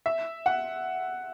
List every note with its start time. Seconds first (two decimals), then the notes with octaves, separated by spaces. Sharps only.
0.06 E5
0.46 F#5